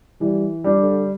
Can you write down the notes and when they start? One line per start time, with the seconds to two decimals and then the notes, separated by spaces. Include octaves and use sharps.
0.21 E3 G3
0.64 G3 D4
0.79 D3